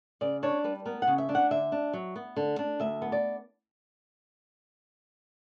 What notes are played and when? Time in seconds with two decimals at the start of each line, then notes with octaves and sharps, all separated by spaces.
0.21 C#3 D5
0.43 D4 C#5
0.64 G3 B4
0.85 B3 A#4
1.02 F#5
1.07 C#3
1.18 E5
1.29 D4
1.35 F#5
1.51 D3 E5
1.72 D4
1.93 F#3
2.16 B3
2.36 D3
2.59 D4
2.80 D2 E5
3.02 B3
3.12 D5